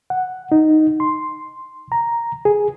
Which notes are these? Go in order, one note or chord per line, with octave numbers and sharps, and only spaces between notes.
F#5
D#4
C6
A#5
G#4